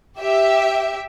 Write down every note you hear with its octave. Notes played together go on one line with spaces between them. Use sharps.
G4 E5